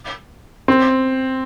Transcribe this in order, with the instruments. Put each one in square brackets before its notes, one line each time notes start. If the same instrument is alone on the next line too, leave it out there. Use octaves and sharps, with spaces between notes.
[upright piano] C4